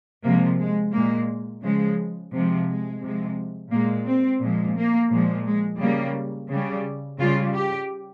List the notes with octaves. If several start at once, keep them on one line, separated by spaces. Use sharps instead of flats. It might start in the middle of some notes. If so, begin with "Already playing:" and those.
C3 F3 G#3 A#3
G#3
A#2 G#3 A#3
C#3 F3 G#3
C3 F3 G#3
G#3
C3 F3 G#3
A#2 G#3 A#3
C4
A#2 F3 G#3
A#3
A#2 F3 G#3
G#3
C#3 G3 A#3
C#3 G3
C#3 G3 F4
G4